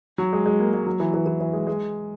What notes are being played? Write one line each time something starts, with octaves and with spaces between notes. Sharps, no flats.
F#3
G#3
G#3
A#3
G#3
F#3
E3
E3
E3
E3
G#3
G#3